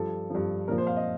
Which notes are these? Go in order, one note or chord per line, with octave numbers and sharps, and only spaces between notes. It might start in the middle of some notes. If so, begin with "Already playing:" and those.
Already playing: G2 F3 A4
G2 F3
A#2 F3 A#4
C5
F5
D#5